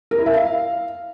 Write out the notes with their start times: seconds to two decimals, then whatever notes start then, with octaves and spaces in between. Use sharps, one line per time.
0.11 A#4
0.19 E4
0.26 E5
0.34 F5